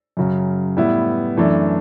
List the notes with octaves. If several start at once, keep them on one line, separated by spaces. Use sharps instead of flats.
F#2 C#3 F#3 C#4
A2 G3 B3 E4 B4
F#2 E3 A3 D4